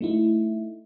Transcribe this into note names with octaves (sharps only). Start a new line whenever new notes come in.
A3 D#4 E4